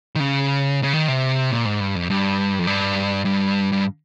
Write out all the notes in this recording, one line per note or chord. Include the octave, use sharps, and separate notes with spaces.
D#3
C#3
C#3
D#3
C3
A#2
G#2
G2
F2
G2
F2
G2
G2
G2